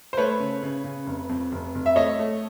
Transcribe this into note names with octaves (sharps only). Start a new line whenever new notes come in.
C5
A3 B4 C#5
C#3
C#3
C#3
F1
F2
F1
F1
E5
A3 C#5 D#5
A3